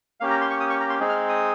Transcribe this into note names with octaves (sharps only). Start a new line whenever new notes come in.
A#3 C#4 G4 F5
A#5
C6
C#6
D#6
C#6
A#5
C6
G#3 C4 D#4 G#4
F6
D#6